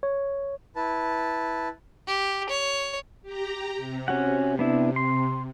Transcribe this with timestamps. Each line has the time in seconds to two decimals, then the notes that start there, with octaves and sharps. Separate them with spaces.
0.03 C#5
0.76 E4 B4 A5
2.07 G4
2.50 C#5
3.22 G4 A#5
3.76 C3
4.08 C#4 F#4 F#5
4.59 B3 D4 E4
4.96 C6